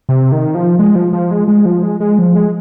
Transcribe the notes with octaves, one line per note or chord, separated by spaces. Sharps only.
C3
D#3
F3
G#3
F3
F3
G#3
G#3
F3
G#3
G#3
F3
G#3